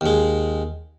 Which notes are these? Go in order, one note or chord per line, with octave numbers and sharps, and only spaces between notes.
D#2 G#3